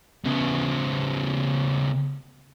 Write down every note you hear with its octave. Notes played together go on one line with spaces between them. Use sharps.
C#3 B3